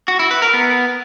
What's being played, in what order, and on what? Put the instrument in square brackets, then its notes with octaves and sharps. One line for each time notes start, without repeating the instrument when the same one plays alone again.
[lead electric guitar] F#4
E4
B4
A#4
B3